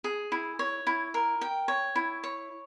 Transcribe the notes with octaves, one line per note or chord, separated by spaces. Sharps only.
G#4
E4
C#5
E4
A#4
G5
C#5
E4
C#5